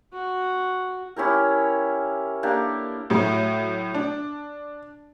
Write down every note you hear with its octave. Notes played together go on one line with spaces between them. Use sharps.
F#4
C#4 E4 G4 A#4
A#3 D4 G4 A4
A2 F#3 A3
D4